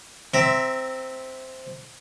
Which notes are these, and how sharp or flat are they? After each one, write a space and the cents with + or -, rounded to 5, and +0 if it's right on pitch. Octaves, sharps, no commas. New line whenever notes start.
C4 -5 E5 +0 A#5 +0